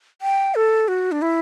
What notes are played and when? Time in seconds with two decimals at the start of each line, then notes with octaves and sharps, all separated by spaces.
0.21 G5
0.55 A4
0.88 F#4
1.12 D4
1.22 E4